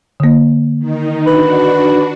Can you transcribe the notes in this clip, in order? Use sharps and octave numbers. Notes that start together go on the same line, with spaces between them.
D3 A#3
D#3 D#4
D4 F#4 B4